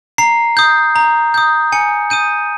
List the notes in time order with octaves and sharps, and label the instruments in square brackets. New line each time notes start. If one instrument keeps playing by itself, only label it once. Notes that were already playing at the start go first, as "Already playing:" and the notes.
[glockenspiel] A#5 C7
D#6 G6
A#5
D#6 G6
G#5 C#7
D#6 G6 D#7